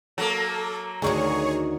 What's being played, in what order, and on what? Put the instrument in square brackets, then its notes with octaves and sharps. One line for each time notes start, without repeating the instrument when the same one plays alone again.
[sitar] F#3 A#3 [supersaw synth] A4
[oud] D2 D#3 F#4 [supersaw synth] G#4 C#5 C#6